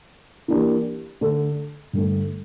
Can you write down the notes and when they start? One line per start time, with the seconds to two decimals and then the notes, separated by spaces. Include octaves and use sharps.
0.48 E3 A#3 D4 G4
1.21 D3 A3 D4 A4
1.93 G2 D3 A3